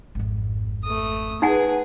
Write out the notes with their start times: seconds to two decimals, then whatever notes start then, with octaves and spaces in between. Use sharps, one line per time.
0.15 G#1 F2
0.84 A3 D#6
1.42 D#4 G#4 B4 F#5 G#5